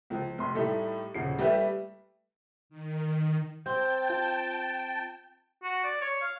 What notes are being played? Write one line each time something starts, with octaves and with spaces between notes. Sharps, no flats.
C#2 F3
F1 C6
A2 G3 A3 D#4 A4
D#1 C#3 F3 C7
G3 A3 G4 B4 E5
D#3
C4 G5 A5 G6
F4
F#4
D5
C#5
F5